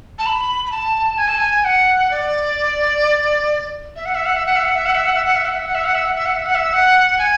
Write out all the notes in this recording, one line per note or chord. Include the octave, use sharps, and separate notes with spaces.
A5
B5
B5
A5
G#5
A5
G#5
F#5
D5
E5
F#5
E5
F#5
E5
F#5
E5
F#5
E5
F#5
E5
F#5
E5
F#5
E5
F#5
E5
F#5
E5
F#5
E5
F#5
E5
F#5
E5
F#5
E5
F#5
G#5